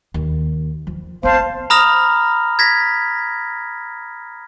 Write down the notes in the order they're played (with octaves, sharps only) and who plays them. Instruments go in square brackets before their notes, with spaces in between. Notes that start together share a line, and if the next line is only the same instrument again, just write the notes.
[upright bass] D#2
F3
[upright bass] B3 C4 [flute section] C5 F5 A5
[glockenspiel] A#5 B5 D#6 F6 A#6 F7
G#6 A#6 B6